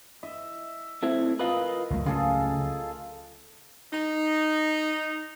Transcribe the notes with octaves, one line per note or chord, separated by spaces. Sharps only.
D#5 E5
A3 C4 E4
F4 A#4 B4 D#5
C#2 F#3 A3
C#3 F4 G#4 A4
D#4